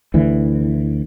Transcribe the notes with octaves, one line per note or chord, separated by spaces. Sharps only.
D2 E3